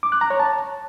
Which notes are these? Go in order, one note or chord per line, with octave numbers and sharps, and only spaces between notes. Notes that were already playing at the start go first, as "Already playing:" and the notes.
D6
F#6
A#5
C#5
A5